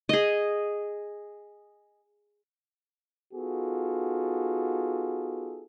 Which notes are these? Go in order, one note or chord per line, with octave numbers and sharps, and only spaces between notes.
G#4 D#5
B3 D#4 F4 F#4 G#4 A4